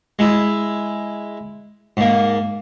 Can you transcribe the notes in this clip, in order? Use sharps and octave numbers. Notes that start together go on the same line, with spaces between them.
G#3 E4
G#2 A#3